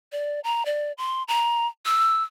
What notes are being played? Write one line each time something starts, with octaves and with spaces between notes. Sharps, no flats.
D5
A#5
D5
C6
A#5
E6